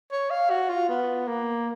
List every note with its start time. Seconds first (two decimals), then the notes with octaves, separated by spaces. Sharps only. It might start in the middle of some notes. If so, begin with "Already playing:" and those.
0.11 C#5
0.30 F5
0.50 F#4
0.69 F4
0.89 B3
1.27 A#3